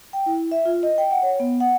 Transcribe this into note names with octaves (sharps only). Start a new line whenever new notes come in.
G5
E4
E5
F4
D#5
G5
F#5
C#5
B3
F#5